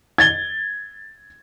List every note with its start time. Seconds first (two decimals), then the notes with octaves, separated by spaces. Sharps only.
0.18 G#6 A6 G7